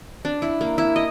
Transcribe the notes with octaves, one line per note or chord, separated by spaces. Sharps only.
D4
E4
A#3
E4
D#5